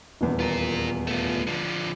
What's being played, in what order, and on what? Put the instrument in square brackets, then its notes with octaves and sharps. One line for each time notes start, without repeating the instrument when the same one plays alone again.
[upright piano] D#1 E2
[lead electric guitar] F4 A#4
A3 F4
D3 F3